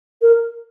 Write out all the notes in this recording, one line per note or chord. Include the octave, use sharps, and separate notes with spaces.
A#4